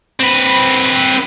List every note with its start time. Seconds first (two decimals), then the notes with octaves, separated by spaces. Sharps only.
0.20 C4 B4